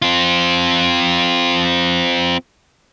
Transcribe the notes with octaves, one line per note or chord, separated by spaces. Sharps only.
C4 F4